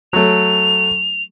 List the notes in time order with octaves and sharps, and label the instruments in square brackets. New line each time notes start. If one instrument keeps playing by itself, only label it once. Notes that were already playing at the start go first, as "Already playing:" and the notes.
[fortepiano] F#3 A3 [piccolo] F7